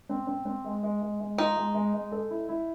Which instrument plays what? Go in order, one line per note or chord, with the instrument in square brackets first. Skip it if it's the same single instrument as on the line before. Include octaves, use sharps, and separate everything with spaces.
[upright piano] C4
C4
C4
G#3
G#3
G#3
G#3
[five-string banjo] D#4 [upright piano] F4
[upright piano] G#3
G#3
G#3
A4
E4
E4